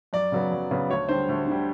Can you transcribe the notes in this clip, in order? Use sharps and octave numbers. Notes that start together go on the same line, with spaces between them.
F#2 D5
C#3 F#3 B3
F#2
C#3 F#3 B3
D2 C#5
D3 G3 C5
D2
D3 G3